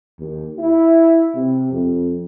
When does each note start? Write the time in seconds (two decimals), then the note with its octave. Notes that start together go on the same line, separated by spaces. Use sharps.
0.19 D#2
0.59 E4
1.34 C3
1.73 F2